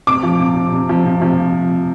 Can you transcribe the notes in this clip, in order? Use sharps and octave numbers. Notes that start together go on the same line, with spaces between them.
C3 D6
F3
C3
C3
C3
F3
C3
F3